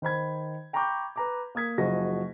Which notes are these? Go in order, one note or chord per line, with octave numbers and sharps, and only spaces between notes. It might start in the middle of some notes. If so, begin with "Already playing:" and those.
D#3 C5 B5 G#6
G5 A#5 B5 C#6 D6 G6
B4 A#5 D6
A#3 D#6 G#6 B6
F#1 F3 F#4 G#4 D#5 A#6